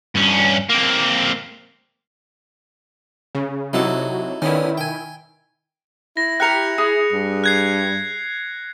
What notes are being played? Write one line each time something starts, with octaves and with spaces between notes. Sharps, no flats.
G2 C#4
A#3 C4
C#3
C3 F#3 D#4 E4 A4
D3 D#3 B3 C#4 E4
G5 G#5
E4 A#6
G4 A#4 G5 F#6 C#7 F7
G#4 B5 D#6
G2
F#6 G#6 C7